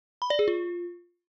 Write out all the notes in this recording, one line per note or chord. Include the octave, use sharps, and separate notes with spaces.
B5
D5
G#4
F4